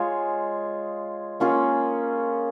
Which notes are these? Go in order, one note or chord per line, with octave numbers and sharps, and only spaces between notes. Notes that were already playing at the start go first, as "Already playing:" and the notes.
Already playing: G#3 F4 G#4 C#5
A#3 C#4 F4 G#4